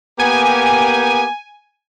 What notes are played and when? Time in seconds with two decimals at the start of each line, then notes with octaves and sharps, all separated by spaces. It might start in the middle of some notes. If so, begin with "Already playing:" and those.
0.19 A#3 B3 G4 G#5